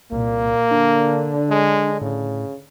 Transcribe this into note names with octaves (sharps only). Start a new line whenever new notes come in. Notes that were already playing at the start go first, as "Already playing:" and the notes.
C2 A#2 A#3
D3 D4
G#3
A2 C#3